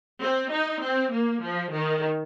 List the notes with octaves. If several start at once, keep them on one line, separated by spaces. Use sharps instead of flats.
C4
D#4
C4
A#3
F3
D#3